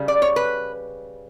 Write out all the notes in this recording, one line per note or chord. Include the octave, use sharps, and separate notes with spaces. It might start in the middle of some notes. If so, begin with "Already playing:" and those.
Already playing: C#3 G3
D5
C#5
B4